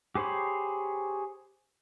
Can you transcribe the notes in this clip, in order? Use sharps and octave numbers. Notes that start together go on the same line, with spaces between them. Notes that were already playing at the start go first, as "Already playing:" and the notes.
G4 G#4 C5 C#5 B5